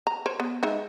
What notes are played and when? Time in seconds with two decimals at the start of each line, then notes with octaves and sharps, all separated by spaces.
0.07 A#5
0.26 A#4 C5 C#5
0.40 B3
0.63 G#3 D#4 E5